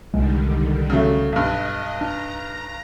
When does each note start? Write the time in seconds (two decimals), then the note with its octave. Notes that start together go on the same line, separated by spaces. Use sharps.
0.14 C2 D3 D#3 G3 G#3
0.90 C#3 F#3 A3
1.32 B1 G2 D#5
2.01 D4 A#5